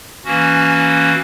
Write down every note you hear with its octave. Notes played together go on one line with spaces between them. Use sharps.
E3 A#3 C#4 F#4